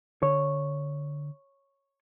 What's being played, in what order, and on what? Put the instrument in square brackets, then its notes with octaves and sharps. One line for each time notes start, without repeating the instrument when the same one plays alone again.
[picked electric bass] D3 [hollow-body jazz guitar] C#5